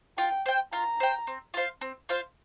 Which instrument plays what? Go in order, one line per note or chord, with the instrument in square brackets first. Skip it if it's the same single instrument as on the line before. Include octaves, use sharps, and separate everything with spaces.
[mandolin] F4 [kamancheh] G5
[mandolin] C5 G5
[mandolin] F4 [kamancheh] A#5
[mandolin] C5 G5
C4
F4 C5 F5
C4
F4 C5 F5